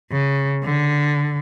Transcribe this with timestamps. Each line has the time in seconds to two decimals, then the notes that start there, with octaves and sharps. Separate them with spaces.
0.12 C#3
0.64 D3